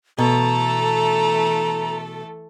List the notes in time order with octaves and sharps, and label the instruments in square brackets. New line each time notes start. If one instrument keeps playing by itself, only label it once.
[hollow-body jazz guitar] B2 [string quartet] E3 A3 A4 [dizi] A#5